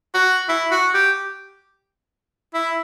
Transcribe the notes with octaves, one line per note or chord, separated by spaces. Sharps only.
F#4
E4
F#4
G4
E4